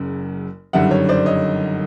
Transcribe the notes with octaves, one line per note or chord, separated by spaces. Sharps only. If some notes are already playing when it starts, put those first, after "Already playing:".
Already playing: F#1 F#2 C#3
G1 F#2 D#3 G3 E5 F#5
C#5
C5 D5
C#5 D#5